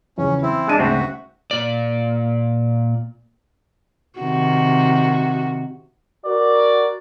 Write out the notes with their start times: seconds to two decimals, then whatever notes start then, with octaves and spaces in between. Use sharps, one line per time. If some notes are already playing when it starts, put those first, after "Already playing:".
0.18 E2 C#3 F3 C#4
0.43 E3 C4 E4
0.68 G#3 D4 D#5 A5 D#7
0.79 D2 G#2 C#3 C4 F#4 E5
1.51 A#2 D5
4.20 C3 D#3 F#4
6.26 F#4 A#4 D5